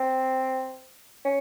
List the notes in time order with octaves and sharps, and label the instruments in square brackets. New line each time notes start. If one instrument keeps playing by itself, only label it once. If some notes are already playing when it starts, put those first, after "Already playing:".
Already playing: [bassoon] C4
C#4